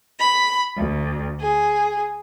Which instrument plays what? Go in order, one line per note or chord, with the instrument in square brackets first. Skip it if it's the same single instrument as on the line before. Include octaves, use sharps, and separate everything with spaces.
[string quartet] B5
D2
G#4